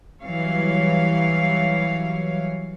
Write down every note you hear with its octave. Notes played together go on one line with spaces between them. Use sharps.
E3 F#3 G3 C#5 F5